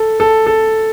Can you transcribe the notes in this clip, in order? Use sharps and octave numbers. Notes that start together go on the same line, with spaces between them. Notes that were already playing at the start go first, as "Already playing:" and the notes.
Already playing: A4
A4
A4